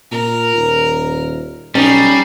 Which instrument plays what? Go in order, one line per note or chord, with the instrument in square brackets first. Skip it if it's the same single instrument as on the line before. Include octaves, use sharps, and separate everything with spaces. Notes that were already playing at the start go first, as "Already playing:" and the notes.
[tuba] A#2 [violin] A#4
[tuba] D#1
[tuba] B1 [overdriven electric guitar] G3 [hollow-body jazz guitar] C#4 [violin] D#4 C7